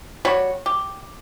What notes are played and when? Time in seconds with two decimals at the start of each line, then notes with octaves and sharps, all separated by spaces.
0.25 G3 F#4 C#5
0.66 G4